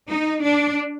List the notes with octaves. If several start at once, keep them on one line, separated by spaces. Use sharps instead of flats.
D#4
D4